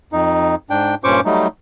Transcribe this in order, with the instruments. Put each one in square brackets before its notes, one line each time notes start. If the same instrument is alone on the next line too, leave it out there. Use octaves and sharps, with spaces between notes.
[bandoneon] F2 D#4
G#2 D4 G5
G2 A#2 C#4 C5 C#6 D6
F#3 G3 A3 D#4